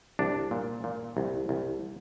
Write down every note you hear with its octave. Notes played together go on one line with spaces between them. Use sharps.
C2 D4
A#2
A#2
C2
C2